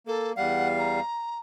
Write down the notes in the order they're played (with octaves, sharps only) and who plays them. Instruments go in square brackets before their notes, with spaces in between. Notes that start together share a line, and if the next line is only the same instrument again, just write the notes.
[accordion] A#3 [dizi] A4
[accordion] E2 G3 F5 [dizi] F#5
[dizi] A#5